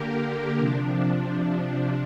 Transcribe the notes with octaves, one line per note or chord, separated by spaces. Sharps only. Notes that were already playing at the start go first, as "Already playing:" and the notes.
Already playing: D3 A#3 G4 A#4
C3 F3 D4